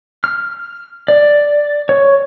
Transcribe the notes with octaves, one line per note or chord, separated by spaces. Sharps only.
F6
D5
C#5